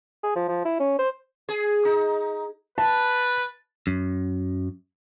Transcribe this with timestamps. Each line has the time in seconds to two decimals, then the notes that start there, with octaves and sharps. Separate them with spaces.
0.23 G#4
0.36 F3
0.48 F3
0.65 E4
0.80 C#4
0.99 C5
1.49 G#4
1.85 D#4
2.78 B4 A5
3.87 F#2